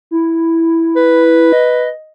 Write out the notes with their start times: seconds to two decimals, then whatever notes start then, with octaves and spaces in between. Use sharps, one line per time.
0.11 E4
0.96 B4
1.52 D#5